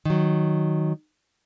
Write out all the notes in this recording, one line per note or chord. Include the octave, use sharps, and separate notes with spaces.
D#3 F#3